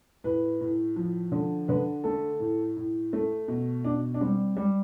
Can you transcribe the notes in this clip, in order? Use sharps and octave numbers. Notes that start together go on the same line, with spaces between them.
A2 B4
A2
F3
D3
D3 B4
A3 A4
A2
A2
A3
B2
B2 D4
D4
G3 C4
G3